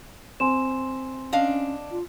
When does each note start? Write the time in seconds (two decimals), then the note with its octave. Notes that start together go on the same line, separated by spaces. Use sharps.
0.40 C4 G#5 C6 E7
1.33 C#4 D4 D#5 F5
1.91 F4